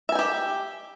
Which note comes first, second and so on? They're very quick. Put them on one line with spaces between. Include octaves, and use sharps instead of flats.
E5 G#5 G5 G4